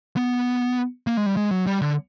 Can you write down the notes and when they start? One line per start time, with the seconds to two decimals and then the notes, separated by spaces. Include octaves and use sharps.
0.16 B3
1.07 A#3
1.17 G#3
1.26 G3
1.37 G#3
1.51 F#3
1.67 G3
1.82 D3